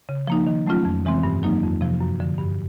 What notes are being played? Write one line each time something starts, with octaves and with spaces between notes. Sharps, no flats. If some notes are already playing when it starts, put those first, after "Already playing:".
C#3
F3 A#3 D#4
D#3
F#3 A3 C#4 F4
F2
C3 E3 G#3 C4
G2
D#3 F#3 A#3 D#4
F2
C3 F3
F#2
D3 F3
G2